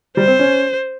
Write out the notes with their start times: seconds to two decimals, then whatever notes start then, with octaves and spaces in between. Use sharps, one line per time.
0.17 G3 C5
0.27 C4
0.39 C#4